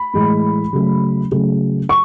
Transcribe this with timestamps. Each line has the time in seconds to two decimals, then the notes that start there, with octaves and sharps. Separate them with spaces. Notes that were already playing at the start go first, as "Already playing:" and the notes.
Already playing: B5
0.14 A2 E3 G#3
0.73 C#3 F#3 A3
1.31 C#3 F#3 A3
1.89 C#6